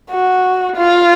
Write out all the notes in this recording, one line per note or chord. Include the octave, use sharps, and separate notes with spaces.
F#4
F4